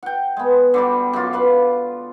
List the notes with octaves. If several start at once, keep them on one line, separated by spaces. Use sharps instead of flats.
F#5 G5
G#3 B3
D3 G3 F#4
F#2 F4
F4 B4 F5